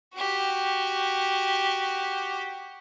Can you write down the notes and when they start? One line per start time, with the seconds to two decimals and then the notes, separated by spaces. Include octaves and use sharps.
0.15 F#4 G4